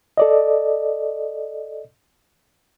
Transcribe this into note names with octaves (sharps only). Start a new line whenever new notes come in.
A4 D5 D#5